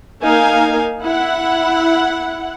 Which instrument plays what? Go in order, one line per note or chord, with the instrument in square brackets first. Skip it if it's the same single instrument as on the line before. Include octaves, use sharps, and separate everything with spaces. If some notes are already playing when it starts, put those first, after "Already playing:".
[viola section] A#3 D#4 A#4 F5 G#5
E4 F#5